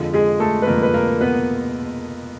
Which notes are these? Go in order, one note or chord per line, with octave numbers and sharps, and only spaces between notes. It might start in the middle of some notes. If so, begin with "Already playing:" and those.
Already playing: F2 D3 F3 G#3
G#3 G#4
A3 A4
B4
F2 D3 F3 G#3 A#3 A#4
B4
A#3 A#4
B3 B4